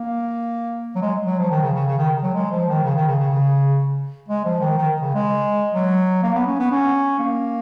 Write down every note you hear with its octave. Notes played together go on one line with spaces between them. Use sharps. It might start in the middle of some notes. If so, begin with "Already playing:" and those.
Already playing: A#3
F#3
G#3
F#3
F3
D#3
C#3
C#3
C#3
D#3
F#3
G#3
F3
D#3
C#3
D#3
C#3
C#3
C#3
G#3
F3
D#3
D#3
C#3
G#3
F#3
A#3
B3
C#4
B3
C#4
A#3